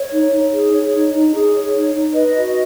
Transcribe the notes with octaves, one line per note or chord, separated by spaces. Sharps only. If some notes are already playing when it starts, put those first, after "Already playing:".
Already playing: C#5
D#4
D#4
G#4
C#5
D#4
D#4
G#4
C#5
D#4
D#4
B4 D#5
F#4